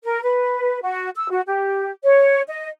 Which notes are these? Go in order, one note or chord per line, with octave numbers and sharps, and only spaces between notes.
A#4
B4
F#4
E6
F#4
G4
C#5
D#5